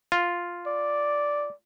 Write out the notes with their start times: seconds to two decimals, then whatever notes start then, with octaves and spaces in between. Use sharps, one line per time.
0.12 F4
0.67 D5